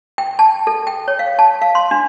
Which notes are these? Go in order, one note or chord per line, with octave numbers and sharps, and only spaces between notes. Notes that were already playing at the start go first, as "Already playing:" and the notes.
G5
A5
A4
G5
C#5
F5
A5
F5
C6
D4